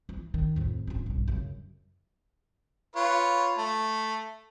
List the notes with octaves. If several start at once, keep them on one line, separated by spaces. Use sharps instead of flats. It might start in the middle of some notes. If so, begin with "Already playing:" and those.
E3
D#3
F2 A2
D1 C#4
B1 G2
F#2 C#3
F4 B4 C#5
A3